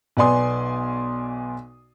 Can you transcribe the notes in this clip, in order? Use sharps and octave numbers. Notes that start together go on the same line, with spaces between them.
B1 B3 D5 G#5 C6 D#6